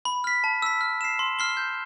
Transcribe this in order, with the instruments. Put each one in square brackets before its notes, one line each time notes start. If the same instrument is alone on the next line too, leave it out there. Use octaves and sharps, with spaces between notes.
[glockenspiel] B5
F6 B6
A5
E6 B6
F6
C7 E7
C6
F6 C7 G7
G6